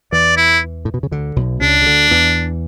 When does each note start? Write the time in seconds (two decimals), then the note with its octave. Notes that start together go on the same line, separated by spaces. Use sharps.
0.12 E2 E3 D5
0.37 E4
0.85 A2
0.94 B2
1.03 C#3
1.11 D2 D3
1.36 B1 B2
1.61 C#2 C#3 D4
1.82 C#3
1.85 D2 D3
2.11 E2 E3